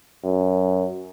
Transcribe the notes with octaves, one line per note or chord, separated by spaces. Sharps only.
F#2